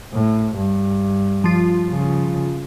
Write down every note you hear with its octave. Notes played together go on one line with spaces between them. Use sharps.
A2
G2
F3 F4
C#3